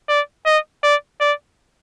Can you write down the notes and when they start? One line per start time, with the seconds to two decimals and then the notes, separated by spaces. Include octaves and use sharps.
0.09 D5
0.46 D#5
0.84 D5
1.21 D5